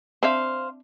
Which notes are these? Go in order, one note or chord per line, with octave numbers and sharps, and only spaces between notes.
C4 D4 C5 E5 F5